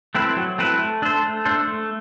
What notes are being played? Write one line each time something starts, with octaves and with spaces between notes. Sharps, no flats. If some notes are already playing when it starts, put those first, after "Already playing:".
A3 C4 E4 B4
F#3
A3 C4 E4 B4
A3
D4 A4 C5
A3
D4 A4 C5
A3